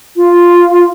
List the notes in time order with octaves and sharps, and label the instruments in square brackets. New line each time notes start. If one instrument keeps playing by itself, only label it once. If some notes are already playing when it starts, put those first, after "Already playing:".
[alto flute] F4